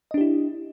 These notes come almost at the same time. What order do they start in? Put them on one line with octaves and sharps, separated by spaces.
D#5 D4 G4 E4